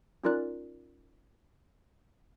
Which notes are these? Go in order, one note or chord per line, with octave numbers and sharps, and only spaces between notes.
C#4 D#4 F4 A#4 D5 F#6